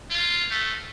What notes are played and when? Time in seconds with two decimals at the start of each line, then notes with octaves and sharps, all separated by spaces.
0.10 F4
0.50 A3